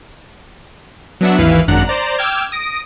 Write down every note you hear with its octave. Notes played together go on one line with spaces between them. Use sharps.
F#3 B3 D4 E5 F#5
G#1 D#2 E3 E4 B4 F5
G#1 F#2 D4 F#5 A#5 F#6
C5 D5 A#5
G5 D6 E6 F6 G#6
D#6 A#6 D7